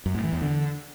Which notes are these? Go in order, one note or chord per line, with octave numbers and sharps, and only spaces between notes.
F#2
A2
E3
E2
D3